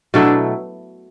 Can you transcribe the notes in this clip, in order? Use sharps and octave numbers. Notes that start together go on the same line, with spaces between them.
B2 F#3 A3 D4 E4